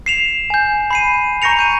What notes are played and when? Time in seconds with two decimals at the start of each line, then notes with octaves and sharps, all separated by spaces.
0.06 C7 E7 F7
0.50 G#5 G6
0.91 B5 C7 D#7
1.42 A#5 C#6 G6 A#6 C#7 F7
1.59 G6 D#7